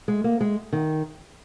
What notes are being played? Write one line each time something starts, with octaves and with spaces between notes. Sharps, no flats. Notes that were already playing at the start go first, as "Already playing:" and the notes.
G#3
A#3
G#3
D#3